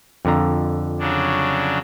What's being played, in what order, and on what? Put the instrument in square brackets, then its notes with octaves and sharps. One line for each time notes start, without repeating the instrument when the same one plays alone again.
[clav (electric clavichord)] F2 D3 A#5
[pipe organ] C#3 F#3 D4